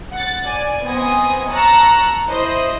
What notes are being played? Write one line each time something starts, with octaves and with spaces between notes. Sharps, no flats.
F#5 A6
D5 G#5
B3 C4 D#5 G#5 D#6
A5 A#5 C#6 E6 F#6 A#6
E4 C5 D#5